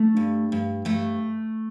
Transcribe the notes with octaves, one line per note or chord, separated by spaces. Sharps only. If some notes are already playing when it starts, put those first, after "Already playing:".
Already playing: A3
G2
G2
G2 A3